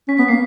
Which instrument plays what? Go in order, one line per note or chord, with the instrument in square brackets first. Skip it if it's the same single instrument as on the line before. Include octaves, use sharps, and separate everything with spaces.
[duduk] C#4 [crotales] B6
[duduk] B3 [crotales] B6
[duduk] A#3 [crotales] C7